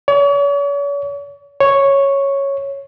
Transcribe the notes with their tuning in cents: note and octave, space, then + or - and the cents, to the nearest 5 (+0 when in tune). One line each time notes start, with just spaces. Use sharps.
C#5 +40
C#5 -5